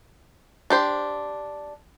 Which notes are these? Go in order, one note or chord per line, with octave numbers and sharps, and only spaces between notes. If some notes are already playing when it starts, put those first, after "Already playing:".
D4 G4 C5